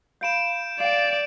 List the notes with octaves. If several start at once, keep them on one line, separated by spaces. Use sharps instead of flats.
F5 B5 G6 D7 E7
D5 F5 G5